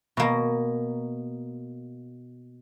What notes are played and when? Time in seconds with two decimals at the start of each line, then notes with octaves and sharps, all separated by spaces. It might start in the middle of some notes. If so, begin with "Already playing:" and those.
0.17 B2 A#3